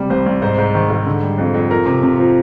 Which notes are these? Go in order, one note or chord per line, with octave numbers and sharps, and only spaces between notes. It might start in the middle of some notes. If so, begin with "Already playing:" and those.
Already playing: C3 G3
C2 C5
C2
G#2 C5
G#2
D#3
G#2
D3
G3
F2
F2
F3 A#4
C3
C3
F3